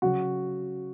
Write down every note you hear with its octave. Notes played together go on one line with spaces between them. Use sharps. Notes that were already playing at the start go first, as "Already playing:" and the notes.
C#3 F#3 F#4